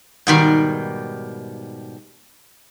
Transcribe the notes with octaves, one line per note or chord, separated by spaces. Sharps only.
G#2 B2 D#3 G3